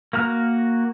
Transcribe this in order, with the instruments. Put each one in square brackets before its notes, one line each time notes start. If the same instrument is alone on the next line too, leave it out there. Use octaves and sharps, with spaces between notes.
[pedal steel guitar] A#3 F#4 A#5 F6